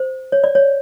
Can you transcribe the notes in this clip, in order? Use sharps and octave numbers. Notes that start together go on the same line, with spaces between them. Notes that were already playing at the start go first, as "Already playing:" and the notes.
Already playing: C5
C#5
D5
C#5